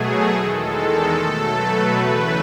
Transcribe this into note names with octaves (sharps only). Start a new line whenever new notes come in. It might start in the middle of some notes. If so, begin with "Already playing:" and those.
Already playing: B2 F#3 A3 G#4
E2 D#3 G#3 A4
B2 F#3 A3
B4
E2 C#3 E3 A3